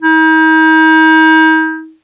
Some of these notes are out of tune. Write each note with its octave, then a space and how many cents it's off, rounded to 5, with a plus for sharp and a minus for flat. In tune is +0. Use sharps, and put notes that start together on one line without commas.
D#4 +40